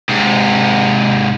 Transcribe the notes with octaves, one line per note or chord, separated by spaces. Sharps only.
G#2 C3